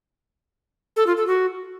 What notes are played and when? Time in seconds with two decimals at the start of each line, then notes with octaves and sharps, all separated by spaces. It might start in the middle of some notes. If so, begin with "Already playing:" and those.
0.96 A4
1.07 F4
1.17 A4
1.27 F#4